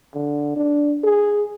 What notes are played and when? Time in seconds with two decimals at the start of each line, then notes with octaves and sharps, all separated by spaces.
0.15 D3
0.56 D4
1.04 G#4